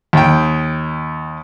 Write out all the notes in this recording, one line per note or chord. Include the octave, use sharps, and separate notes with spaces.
D#2 G5